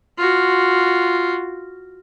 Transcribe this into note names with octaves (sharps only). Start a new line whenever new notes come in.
F4 F#4